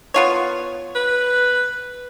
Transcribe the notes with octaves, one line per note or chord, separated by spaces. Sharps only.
B3 F4 C#5
B4